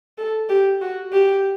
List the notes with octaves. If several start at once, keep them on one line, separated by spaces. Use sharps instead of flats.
A4
G4
F#4
G4